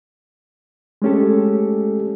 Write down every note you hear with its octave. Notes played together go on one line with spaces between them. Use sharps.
G#3 A3 C#4 G4 A4